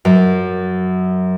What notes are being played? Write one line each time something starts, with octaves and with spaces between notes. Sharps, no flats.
F#2